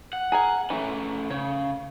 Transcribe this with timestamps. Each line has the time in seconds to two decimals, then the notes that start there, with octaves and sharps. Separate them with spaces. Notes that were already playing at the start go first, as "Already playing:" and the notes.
0.13 F#5
0.32 G#4 A#4 G#5
0.70 E3 A3 C#4
1.30 C#3 C#5